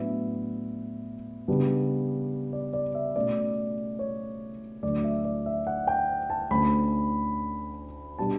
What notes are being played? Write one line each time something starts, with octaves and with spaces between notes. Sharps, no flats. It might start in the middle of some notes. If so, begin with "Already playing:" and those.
Already playing: A2 F#3 B3 D4 E5
C#3 G3 B3 D4
D5
D5
E5
B2 A3 C#4 D5
C#5
D2 D3 F#3 A3 D4 D5
E5
D5
E5
F#5
G5
A5
D2 D3 A3 C#4 B5
B2 G3 D4 A5